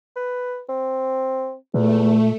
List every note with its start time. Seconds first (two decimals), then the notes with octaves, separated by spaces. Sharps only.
0.16 B4
0.69 C4
1.74 E2 A#2 A3